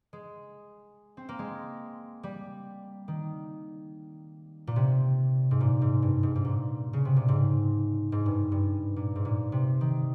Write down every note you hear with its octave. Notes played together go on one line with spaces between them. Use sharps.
G#3
C4
A#3
G#3
G3
D#3
A#2
C3
G#2
A#2
G#2
G2
G#2
G#2
A#2
C#3
C3
A#2
G#2
G#2
G2
G2
A#2
G#2
A#2
C3
D#3